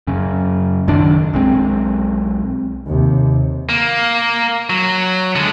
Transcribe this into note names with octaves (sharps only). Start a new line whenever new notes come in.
F#2 C#3
A#1 F#2 D#3 D4
B1 G#3 C4
D#2 C3
A#3
F#3
D3 G#3